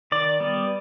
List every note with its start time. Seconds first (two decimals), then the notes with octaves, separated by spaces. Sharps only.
0.12 D#3 D5
0.40 G3 B3